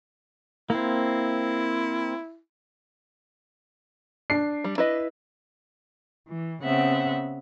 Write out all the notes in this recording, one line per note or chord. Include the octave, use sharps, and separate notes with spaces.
A#3 C4 E4
D4 C7
G3
E4 B4 D#5
E3
C#3 B3 C4 E5 F#5